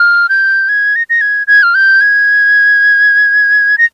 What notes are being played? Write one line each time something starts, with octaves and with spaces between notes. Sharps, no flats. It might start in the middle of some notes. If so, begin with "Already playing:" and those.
Already playing: F6
G6
G#6
A#6
A#6
G#6
G#6
F6
G6
G#6
A#6